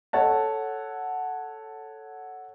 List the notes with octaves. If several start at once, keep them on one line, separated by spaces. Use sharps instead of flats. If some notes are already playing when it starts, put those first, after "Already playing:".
A4 C#5 F#5 A5